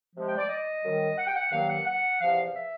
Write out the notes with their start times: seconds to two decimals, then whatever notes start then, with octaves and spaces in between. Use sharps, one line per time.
0.14 C3 F3 G#3
0.26 G5
0.37 D5
0.48 D#5
0.83 F#2 D#3 G3
1.18 F#5
1.27 G5
1.36 F#5
1.51 G2 D#3 F#3 A#3 F5
1.69 F#5
1.86 F#5
2.20 E2 C3 F3 F5
2.55 E5